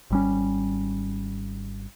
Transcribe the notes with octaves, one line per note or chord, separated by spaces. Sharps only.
G#1 G3 C#4